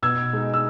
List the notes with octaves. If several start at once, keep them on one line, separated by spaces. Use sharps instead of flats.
B2 E6 G#6
G#3 D#4
E6